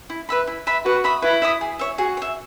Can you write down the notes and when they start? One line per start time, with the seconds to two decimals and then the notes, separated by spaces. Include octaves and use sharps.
0.10 E4
0.29 B4 E5 B5
0.47 E4
0.67 B4 E5 B5
0.85 F#4 B4
1.04 E5 B5 D#6
1.22 E4 B4
1.42 E5 B5 D#6
1.61 G#4
1.79 C#5 E5
1.98 F#4 G#4
2.17 C#5 E5